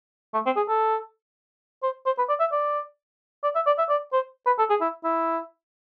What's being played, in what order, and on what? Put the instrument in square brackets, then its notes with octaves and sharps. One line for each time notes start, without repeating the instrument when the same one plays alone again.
[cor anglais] A3
C4
G#4
A4
C5
C5
B4
D5
E5
D5
D5
E5
D5
E5
D5
C5
B4
A4
G#4
E4
E4